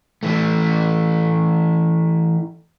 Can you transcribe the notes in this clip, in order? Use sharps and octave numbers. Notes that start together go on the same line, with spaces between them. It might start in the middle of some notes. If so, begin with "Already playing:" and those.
E3 A3